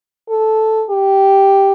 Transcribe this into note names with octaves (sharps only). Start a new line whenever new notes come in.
A4
G4